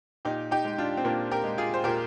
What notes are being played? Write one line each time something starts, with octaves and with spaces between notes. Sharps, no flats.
A#2 D#4 G4
D#4 G4
G#3
D4 F4
C4
A#2 A#3 D4
G4 A#4
G#3
F4 G#4
C5
A#2 G4 A#4